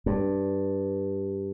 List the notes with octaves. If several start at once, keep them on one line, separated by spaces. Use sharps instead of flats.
G2